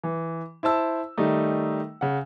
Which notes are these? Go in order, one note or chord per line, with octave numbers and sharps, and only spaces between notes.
E3
E4 C5 A5 E6
D#3 G3 A3 D#4
C#3 F#5